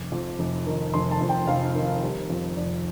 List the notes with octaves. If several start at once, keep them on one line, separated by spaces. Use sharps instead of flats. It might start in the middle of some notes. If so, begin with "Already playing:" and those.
Already playing: F1 D6
F2
F1
D#3
F1 C6
A5
F2
G5
F1 F5
D#3
G3
F2
F1 D5